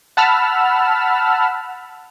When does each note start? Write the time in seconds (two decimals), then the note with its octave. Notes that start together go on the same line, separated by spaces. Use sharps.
0.17 F#5 A5 B5 E6 F6